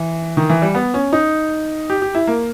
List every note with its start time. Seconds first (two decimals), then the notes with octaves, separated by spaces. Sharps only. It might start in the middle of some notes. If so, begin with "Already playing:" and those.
Already playing: E3
0.37 D#3
0.50 E3
0.62 G3
0.75 B3
0.94 C#4
1.13 D#4
1.90 G4
2.02 G4
2.15 E4
2.27 A#3